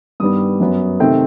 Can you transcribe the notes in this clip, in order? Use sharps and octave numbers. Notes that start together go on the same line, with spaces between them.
G2 D#3 G3 B3 D#6
F#2 F#3 B3
C3 D#3 A3 C4 G5